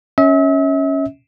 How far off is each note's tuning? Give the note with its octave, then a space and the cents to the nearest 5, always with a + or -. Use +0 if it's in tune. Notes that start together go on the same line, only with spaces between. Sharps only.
C#4 +0 E5 -40